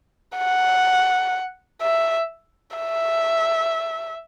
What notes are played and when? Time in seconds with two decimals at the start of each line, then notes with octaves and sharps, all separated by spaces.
0.38 F#5
1.82 E5
2.77 E5